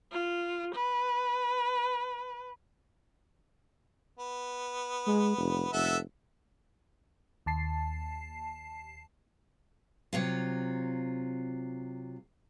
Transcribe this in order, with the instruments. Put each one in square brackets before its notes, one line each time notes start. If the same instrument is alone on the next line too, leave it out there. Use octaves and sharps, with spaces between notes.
[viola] F4
B4
[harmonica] B3
[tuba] G#3
F1
[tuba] F1 [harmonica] A4 E5 F#5
[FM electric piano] D#2 A5 C7
[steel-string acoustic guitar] C3 F#3 F4